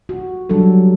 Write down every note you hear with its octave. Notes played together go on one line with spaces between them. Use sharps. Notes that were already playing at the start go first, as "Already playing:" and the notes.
F#4
F#3 G3 D4 A4